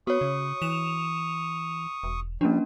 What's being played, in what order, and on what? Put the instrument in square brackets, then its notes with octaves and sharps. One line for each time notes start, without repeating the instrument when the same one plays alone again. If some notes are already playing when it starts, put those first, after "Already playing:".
[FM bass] B3 [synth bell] F#4 C#5 [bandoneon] C#6 D#6
[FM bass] C#3
[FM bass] E3 [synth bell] E7 F7
[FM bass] E1
[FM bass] F3 [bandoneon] G3 [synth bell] A#3 C#4 D4